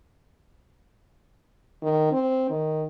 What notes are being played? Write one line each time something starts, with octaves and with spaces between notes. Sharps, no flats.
D#3
C4
D#3